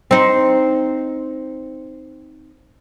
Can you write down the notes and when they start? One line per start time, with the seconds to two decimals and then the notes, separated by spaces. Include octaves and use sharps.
0.11 C4 D#4